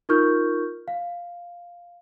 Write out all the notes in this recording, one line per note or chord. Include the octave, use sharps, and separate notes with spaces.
D#4 F4 A#4 C#6 F6 G6
F5